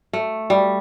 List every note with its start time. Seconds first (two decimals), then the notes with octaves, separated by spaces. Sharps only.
0.13 A3
0.50 G3